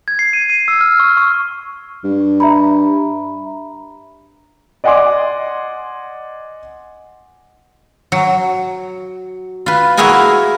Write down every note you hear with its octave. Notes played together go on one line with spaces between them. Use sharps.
G#6
C7
D#7
D#7
E6
F6
C#6
C#6
G2
E5 A#5 B5
D5 D#5 F#5 G#5 C6 D6
F#3
F4 B4
A#3 E4 F#4 G#4 A#4 G#5